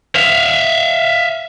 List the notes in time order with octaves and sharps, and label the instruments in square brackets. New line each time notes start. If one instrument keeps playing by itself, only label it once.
[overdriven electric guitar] E5 F5